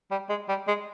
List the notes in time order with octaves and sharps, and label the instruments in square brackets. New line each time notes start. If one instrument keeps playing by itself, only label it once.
[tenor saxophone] G3
G#3
G3
G#3